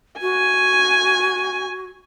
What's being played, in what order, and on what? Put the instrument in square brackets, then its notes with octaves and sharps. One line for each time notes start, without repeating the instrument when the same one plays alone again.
[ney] F#4 [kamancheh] G#5